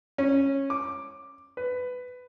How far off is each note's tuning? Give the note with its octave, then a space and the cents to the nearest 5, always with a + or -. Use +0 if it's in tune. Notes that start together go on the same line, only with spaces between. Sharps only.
C#4 -15
D6 +5
B4 +15